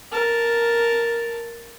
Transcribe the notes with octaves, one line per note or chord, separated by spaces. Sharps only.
A#4 A5